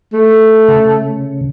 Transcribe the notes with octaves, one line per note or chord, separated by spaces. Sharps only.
A3
C#3